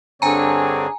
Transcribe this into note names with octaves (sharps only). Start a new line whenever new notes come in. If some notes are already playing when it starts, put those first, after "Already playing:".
G2 D3 C4 D4 G#4 C#5 G#5 A#5